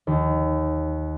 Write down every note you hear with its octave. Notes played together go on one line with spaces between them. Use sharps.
D#2